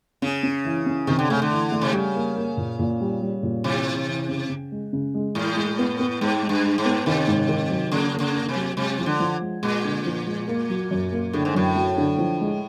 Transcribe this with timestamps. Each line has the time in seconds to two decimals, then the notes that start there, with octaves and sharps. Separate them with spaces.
0.22 C#3 C#4
0.43 C#4
0.65 E3
0.86 C#4
1.07 C3 D#3
1.19 D3
1.30 C#3 A3
1.42 D3
1.51 E3
1.71 A3
1.81 C3
1.93 C#3 G3
2.15 A#3
2.36 A#3
2.57 A#2
2.79 A#2
3.01 G3
3.22 G3
3.43 A#2
3.64 C3 E3
3.85 E3
4.07 E3
4.29 C#3
4.49 C#3
4.72 G#3
4.93 C#3
5.14 G#3
5.35 A2 E3
5.56 G#3
5.79 B3
5.99 B3
6.21 G#2 G#3
6.43 G#3
6.49 G2
6.63 G#3
6.78 G#2
6.85 B3
7.06 C3 D#3
7.28 G#2
7.49 D#3
7.70 F#3
7.91 C#3 A#3
8.13 A#3
8.20 C#3
8.35 A#3
8.48 C3
8.55 F#3
8.77 C3 G#3
8.99 F3
9.06 D3
9.20 F3
9.41 G#3
9.62 A#2 G#3
9.85 D3
10.05 F3
10.26 G#3
10.48 A#3
10.69 F#3
10.91 F#2
11.12 A#3
11.33 A2 D3
11.45 G#2
11.55 F#2 A2
11.76 F#3
11.98 D3
12.18 F3
12.41 G#3